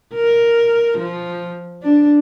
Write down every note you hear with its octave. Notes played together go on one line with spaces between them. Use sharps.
A#4
F3
D4